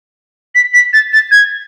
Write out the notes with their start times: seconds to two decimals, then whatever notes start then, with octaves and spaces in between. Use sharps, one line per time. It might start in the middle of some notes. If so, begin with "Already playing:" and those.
0.55 B6
0.74 B6
0.93 A6
1.13 A6
1.31 G#6